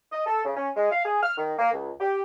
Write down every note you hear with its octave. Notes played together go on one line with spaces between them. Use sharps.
D#5
A4
C#3
C#4
G#3
F5
G#4
F6
D#3
A#3
C#2
G4